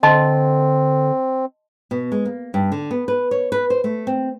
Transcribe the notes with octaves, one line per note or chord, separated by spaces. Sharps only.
D3 C4 D#5 A5 C6
B2
G#3
A#3
G2
D3
B3
B4
C#5
B4
C5
A3
C4